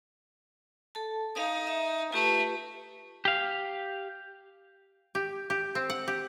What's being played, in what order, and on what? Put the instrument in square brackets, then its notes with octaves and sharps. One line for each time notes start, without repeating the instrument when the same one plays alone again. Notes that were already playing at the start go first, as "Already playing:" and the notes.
[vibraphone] A4 A5
[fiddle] D#4 [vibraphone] F5 D#6
[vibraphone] E5
[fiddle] A3 [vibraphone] F4 G4 B4
[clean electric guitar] G4 F5
[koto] G4
G4
C4
F#5
G4